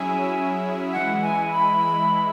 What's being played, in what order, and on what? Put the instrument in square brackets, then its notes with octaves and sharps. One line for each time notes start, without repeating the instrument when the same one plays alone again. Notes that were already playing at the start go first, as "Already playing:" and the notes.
Already playing: [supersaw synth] F#3 C#4 E4 G#4 E5 [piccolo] G#5
[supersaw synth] E3 G#3 E4 [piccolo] F#5
[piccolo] G#5
B5